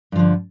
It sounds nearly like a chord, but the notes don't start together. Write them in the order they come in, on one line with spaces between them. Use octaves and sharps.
G2 F3 D3